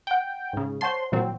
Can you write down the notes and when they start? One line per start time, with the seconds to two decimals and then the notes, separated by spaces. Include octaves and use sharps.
0.07 F#5 G5
0.53 G#2 C#3
0.81 C5 C#5 F#5 A5 C6
1.12 A#2 E3 F#3 C4